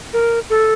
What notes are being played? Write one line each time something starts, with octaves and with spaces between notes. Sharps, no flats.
A#4
A4